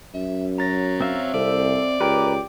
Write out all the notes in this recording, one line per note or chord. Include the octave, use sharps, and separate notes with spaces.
F#2 E5
F#3 A#5 A6 A#6
C4 E5 F5
C2 A4 D5
C#2 G4 A#4 B4 G5 D6